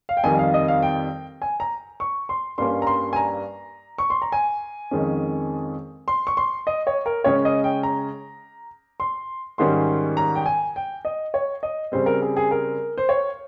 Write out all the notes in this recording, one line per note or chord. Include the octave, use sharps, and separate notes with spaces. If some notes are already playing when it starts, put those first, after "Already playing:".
F5
G5
F2 D#3 G3 G#5
F5
D#5
F5
G5
G#5
A#5
C#6
C6
G2 G3 A#3 C#4 C6
A#5
C6
G#5
A#5
C#6
C6
A#5
G#5
F2 D#3 G#3 C#4
C6
C#6
C6
D#5
C#5
A#4
C#3 G#3 C#4 C#5
D#5
G5
A#5
C6
G#2 D#3 G3 C#4 C6
A#5
G5
G#5
G5
D#5
C#5
D#5
C#3 G3 C4 C5
A#4
G#4
G#4
A#4
C5
C#5